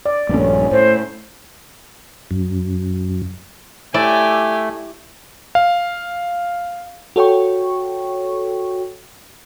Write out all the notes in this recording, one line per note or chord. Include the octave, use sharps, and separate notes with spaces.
D5
A#1 G2 A3 C#4
A2 C5
F#2
A3 E4 G4 D5 G#5
F5
F#4 A4 C#5 G5 C#6